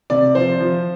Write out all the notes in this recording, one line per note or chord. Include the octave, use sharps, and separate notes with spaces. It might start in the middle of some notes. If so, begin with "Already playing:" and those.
C3 D5
F3 C5
F3